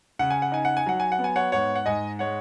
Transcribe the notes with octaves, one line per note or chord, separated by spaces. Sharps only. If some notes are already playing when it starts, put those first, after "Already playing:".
C#3 F#5
G#5
F#5
D#4 G#5
F#5
G#5
F#3 F#5
G#5
F#5
B3
G#5
C#5 F#5
G#2 C#5 F#5
F#5
G#2 D#5 G#5
G#3 C#5 F#5